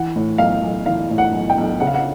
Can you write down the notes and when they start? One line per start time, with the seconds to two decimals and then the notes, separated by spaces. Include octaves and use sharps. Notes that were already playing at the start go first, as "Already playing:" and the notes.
Already playing: E3 F#5
0.16 A2
0.38 B1 F5
0.63 B1
0.86 E3 F5
1.10 A2
1.18 F#5
1.33 B1
1.50 G5
1.58 B1
1.80 C#3 F#5
1.87 F5
1.94 F#5